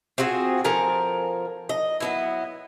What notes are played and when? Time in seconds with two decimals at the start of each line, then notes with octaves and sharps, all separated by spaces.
0.18 C4 F4 F#4 G#4
0.64 F3 A4 A#4 G#5
1.69 D#5
2.00 F#3 B3 E4